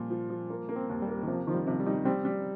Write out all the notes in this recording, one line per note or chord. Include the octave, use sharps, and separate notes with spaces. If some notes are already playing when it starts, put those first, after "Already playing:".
Already playing: A#2 F3 G3
F3
F3
A#3
A#3
C4
D#2
G3
A#3
D#3
C3 F3
D#3 F3
G3
C3
G3
D#4
G3 C4
G3